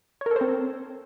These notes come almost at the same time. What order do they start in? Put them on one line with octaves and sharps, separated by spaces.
C#5 A#4 A4 C5 C4